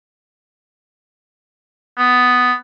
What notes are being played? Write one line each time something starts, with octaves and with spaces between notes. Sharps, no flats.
B3